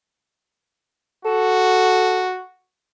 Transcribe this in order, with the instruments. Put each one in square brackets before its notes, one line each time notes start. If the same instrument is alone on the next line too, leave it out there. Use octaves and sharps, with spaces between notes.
[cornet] F#4 [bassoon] A4